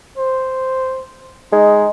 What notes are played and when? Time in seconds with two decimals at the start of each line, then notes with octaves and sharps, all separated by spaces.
0.18 C5
1.53 G#3 D#4